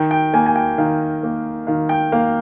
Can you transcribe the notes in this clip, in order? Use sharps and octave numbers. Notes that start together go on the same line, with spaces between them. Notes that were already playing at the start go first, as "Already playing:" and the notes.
Already playing: D#3 G5
G5
A#3 G#5
G#5
G5
D#3 F5
A#3
D#3 F5
G5
A#3 F5